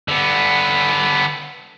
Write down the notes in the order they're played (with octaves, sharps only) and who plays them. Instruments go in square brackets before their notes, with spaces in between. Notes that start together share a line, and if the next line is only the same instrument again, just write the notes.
[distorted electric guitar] D3 B3